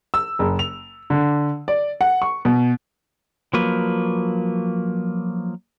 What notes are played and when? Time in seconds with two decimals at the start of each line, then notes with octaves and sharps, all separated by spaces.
0.14 E6
0.39 F#1
0.59 F7
1.10 D3
1.68 D5
2.01 F#5
2.22 C#6
2.45 B2
3.54 F3 F#3 A#3 B4